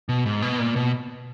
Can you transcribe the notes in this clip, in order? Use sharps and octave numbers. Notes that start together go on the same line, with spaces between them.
B2
G#2
B2
A#2
B2